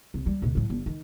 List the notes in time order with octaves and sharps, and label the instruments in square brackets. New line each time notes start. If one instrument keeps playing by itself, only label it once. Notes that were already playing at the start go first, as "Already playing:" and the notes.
[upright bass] C2
G3
D2 B2
A2 F#3
G1
D#3